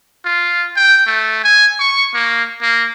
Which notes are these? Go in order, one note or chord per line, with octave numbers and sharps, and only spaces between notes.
F4
G5
A3
G#5
C#6
A#3
A#3